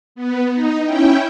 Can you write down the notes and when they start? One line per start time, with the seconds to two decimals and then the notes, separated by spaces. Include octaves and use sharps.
0.15 B3
0.52 D#4
0.84 C#4 E4 G5